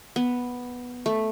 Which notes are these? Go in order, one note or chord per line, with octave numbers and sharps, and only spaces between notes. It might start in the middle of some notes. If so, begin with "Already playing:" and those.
B3
A3